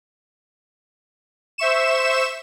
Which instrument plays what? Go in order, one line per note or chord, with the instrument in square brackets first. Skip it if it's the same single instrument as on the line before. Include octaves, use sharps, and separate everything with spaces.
[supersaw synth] C5 E5 C#6 E7